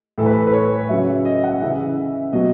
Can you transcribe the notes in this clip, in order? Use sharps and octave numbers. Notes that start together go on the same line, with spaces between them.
A2 E3 A4
B4
A4
B4
C#5
C#3 F#3 E5
D#5
F#5
C#3 E3 E5
B2 F#3 D#5